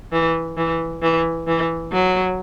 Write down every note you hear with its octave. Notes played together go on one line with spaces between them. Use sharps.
E3
E3
E3
E3
F#3